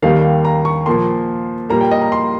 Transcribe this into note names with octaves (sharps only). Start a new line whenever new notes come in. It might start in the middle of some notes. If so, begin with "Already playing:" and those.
D#2 D#3 G3 A#3 F5
A#5
C#6
A#2 F3 A#3 C6
A#2 G3 A#3 A#5
G5
D#5
A#5
C6